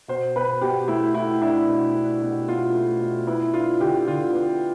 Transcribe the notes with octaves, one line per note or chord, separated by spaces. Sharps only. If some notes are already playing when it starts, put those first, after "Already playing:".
B2 C5
B2 B4
B2 G4
A3 E4
A3 E4
D4 E4
B2
D4
B2
B2 F4
A3
B2
B3 E4
D4 F4
D3 G4
D3 F4
B3